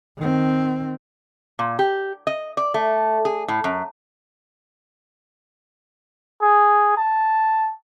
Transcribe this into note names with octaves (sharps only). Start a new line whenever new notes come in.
D#3 C4
A#2
G4
D#5
D5
A3
G#4
A2
F#2
G#4
A5